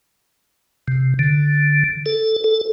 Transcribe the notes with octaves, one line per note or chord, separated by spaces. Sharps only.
C3
D3
A4
A4